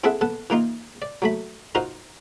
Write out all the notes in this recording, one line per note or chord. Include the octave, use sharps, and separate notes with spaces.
C4 E4 G#4 A4 E5 F#5
B3 A4 F#5
E3 A#3 D#4 F4
D5
F#3 A3 B5
D#4 F4 F#4 A#4 C5